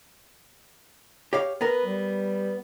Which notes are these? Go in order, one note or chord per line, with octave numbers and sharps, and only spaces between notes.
G4 C#5 F5
B3 A#4 B4
G3